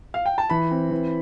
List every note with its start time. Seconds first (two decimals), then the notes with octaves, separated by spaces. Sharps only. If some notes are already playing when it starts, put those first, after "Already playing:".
0.14 F5
0.25 G5
0.38 A5
0.50 E3 B5
0.71 C4
0.91 E3